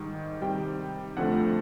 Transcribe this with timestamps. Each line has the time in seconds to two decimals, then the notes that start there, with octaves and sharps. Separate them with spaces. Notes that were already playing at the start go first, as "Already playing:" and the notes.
Already playing: G#2 D#3 G3
0.42 C3 D#3 G3 G5
1.17 F2 D3 F3 A3 F#5